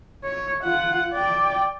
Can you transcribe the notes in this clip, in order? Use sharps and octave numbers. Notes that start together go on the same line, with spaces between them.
C#5
F4 F#5
D5 G5